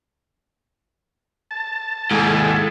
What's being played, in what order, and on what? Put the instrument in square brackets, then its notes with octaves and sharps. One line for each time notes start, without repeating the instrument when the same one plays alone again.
[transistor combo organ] A5
[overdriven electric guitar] D#2 G#2 [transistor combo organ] G#3 E4 A4